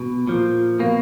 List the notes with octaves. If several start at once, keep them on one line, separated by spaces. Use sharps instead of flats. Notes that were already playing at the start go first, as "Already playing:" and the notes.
Already playing: B2
A#2 F3
B2 A#3